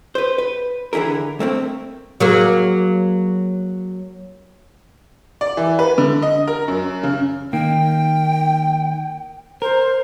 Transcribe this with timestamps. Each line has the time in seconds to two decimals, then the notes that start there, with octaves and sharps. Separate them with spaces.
0.15 B4 C5
0.38 B4
0.93 D3 E3 E4 G#4 A#4
1.40 A3 A#3 C4
2.20 F#3 A#3 G#4
5.41 D5
5.57 E3
5.79 B4
5.98 D3
6.22 D#5
6.48 A#4
6.68 F#2
7.03 C#3
7.53 D#3 A#3 G5
9.62 A#4 C5